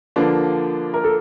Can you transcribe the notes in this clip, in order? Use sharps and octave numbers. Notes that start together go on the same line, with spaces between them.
D3 F3 A#3 D4 B4
A#4
A4